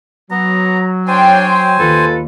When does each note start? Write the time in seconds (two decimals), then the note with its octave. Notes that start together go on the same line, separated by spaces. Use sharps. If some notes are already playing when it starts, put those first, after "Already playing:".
0.31 F#3 B3 A#5
1.07 D4 C5 C#5 G5 G#5 C6
1.79 D#2 F4 A4 B4